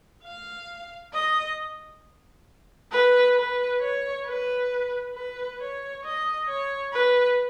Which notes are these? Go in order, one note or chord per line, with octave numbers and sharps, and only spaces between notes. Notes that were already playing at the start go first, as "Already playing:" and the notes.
F5
D#5
B4
B4
C#5
B4
B4
C#5
D#5
C#5
B4